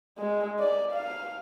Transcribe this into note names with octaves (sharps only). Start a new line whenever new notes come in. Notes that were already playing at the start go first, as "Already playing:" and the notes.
G#3
D5
F5